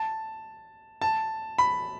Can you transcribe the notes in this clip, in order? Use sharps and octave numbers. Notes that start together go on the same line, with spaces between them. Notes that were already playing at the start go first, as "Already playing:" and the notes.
Already playing: A5
A5
B5